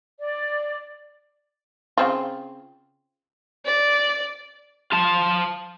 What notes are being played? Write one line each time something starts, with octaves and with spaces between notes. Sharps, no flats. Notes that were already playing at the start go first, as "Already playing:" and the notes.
D5
C#3 C4 F4
D5
F4 A5